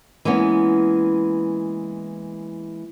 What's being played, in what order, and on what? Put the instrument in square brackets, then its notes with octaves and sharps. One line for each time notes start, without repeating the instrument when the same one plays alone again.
[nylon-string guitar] E3 G#3 A#3 B3 C#4